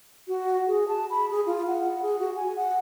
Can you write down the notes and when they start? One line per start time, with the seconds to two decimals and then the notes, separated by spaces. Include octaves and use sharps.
0.28 F#4
0.68 G#4
0.88 A5
1.10 B5
1.31 G#4
1.46 F4
1.67 F#5
2.02 G#4
2.19 F#4
2.36 G#5
2.56 F#5